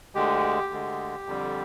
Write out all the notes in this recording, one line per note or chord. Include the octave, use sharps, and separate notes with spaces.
D2 D3 G#3 G4
D2 D3 G#3
F2 D3 G3